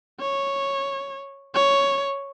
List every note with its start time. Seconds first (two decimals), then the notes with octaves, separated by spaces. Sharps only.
0.20 C#5
1.55 C#5